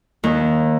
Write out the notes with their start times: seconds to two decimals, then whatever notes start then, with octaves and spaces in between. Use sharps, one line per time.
0.24 D#2